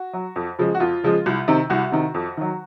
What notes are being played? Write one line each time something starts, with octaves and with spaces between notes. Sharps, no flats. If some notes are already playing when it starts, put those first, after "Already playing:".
Already playing: F#4
F#3
F2
C#3 F3 G#3
F#4
F2 F4
C#3 F3 G#3
C2
C3 D#3
C2 F#4
C3 D#3
F2
D#3 F#3